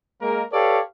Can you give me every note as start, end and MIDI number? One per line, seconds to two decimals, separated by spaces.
0.21 0.43 56
0.21 0.43 58
0.21 0.43 70
0.52 0.80 67
0.52 0.80 69
0.52 0.80 71
0.52 0.80 73
0.52 0.80 74
0.52 0.80 77